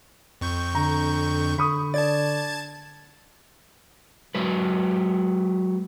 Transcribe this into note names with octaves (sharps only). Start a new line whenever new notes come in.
F2 C#6 G6
D3 A#5
D3 B5 C#6 D#6
D5 A5 G#6 A6
F#3 G#3 B4